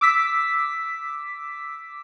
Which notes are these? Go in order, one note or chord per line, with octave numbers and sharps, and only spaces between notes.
D6 E6 B6